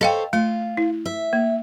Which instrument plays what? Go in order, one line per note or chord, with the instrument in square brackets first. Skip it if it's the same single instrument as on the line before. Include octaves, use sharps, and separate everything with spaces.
[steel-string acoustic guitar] A4 C5 C#5 [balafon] D#5 F5 G5
[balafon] A3 [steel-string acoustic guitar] F4
[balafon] E4
[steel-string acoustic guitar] E5
[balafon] A#3